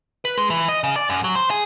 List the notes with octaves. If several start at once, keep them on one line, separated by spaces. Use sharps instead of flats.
B4
G#3
E3
D#5
C#3
D5
F#2
F#3
C5
G#4